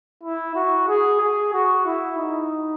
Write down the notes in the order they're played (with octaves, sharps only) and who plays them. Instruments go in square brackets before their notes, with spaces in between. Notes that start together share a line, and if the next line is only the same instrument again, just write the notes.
[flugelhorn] E4
F#4
G#4
G#4
F#4
E4
D#4